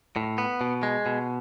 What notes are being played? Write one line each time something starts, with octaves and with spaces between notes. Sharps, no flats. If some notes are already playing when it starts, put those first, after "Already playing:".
A2
B3
B2
G#3
B2